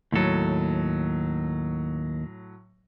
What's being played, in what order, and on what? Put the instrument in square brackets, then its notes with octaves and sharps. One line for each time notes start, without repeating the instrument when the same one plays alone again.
[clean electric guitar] D#2 A4 [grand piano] A2 F#3